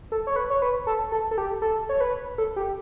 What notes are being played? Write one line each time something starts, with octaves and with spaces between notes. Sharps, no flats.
A4
C#5
B4
C#5
B4
A4
A4
A4
G4
A4
C#5
B4
A4
G4